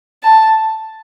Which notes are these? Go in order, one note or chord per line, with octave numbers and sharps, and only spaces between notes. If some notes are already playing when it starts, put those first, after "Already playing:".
A5